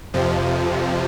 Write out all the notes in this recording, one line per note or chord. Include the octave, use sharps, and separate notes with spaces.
F2 C3 F3